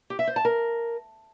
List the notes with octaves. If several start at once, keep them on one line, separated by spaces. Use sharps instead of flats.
G4
E5
C5
A5
A#4